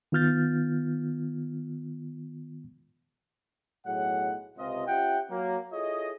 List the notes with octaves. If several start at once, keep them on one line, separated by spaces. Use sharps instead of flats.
D#3 B3 F4 F6 G6 A6
B1 A2 F#3 G#4 F#5
C#2 C3 F4 D#5
C#4 F4 G4 E5 F#5 G5
F#3 A#3
E4 F4 G#4 A4 C#5 D#5